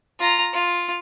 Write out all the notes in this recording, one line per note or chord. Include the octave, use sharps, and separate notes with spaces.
F4 A#5
F4